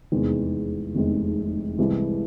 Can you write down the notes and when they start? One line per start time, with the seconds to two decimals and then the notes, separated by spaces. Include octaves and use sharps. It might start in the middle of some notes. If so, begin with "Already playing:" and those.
0.12 F1 E2 C3 D#3 G#3
0.95 F1 E2 C3 D#3 G#3
1.78 C2 C3 E3 G#3